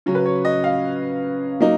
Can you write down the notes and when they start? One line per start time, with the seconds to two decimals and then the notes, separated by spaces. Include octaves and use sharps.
0.06 C#3 F#3 C#4
0.15 B4
0.25 C#5
0.45 D#5
0.64 F5
1.61 F#3 A#3 D#4